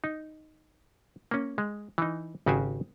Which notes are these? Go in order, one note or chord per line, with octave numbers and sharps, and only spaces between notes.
D#4
A#3 C#4
G#3
E3 D#4
G#1 C#3 F#4 G4 C5 G#5